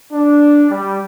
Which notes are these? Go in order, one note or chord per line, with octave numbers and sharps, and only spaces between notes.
D4
G3